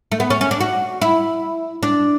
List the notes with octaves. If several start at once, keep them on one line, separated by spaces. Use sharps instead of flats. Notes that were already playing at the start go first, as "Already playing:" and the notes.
A3
B3
C#4
C#4
D4
F#4
E4
D4